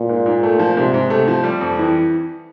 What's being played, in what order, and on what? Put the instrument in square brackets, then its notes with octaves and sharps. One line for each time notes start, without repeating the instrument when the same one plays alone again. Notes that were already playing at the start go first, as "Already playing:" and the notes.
Already playing: [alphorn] A#2
[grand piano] G#2
G#2
A3
F3
[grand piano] G#2 [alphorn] C3
[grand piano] G#2
[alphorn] C3 [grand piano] A3
[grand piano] F3
G3
F2
E3